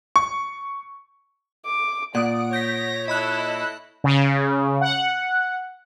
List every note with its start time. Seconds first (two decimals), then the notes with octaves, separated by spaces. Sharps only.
0.16 C#6
1.66 D6
2.15 A#2 D5 F#5 D#6 D7
2.53 C#5 G6 A#6 B6
3.08 E4 A4 D#5 B5 F#6
4.04 C#3
4.81 F#5